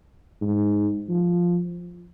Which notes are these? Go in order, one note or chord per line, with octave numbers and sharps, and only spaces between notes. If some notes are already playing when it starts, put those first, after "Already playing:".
G#2
F3